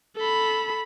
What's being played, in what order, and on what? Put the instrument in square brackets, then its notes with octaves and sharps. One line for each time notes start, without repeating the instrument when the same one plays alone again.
[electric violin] A4 B5